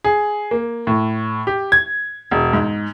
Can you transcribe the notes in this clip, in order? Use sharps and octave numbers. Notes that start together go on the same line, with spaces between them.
G#4
A#3
A2
G4
G#6
E1
G#2